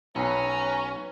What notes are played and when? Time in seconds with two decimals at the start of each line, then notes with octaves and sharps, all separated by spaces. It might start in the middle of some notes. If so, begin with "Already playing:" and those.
0.16 B1 C#4 B4 C#5 A#5